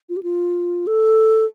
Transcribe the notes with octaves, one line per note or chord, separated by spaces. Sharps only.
F4
G4
F4
A4